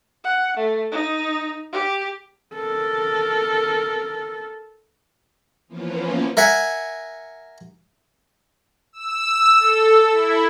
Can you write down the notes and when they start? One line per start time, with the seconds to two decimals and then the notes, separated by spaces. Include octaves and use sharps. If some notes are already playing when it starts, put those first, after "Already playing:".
0.24 F#5
0.57 A3
0.92 D#4
1.72 G4
2.54 A4 A#4
5.68 E3 F3 A#3 B3 C#4 F4
6.37 A#4 E5 F#5 G#5
8.93 E6
9.58 A4
10.12 E4